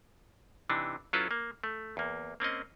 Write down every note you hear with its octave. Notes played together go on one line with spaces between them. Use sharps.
C3 E3 D4 D#4
F#3 C#4 E4 F4 A4 B4
A#3
A3
E2 A#3
A#3 C4 C#4 D#5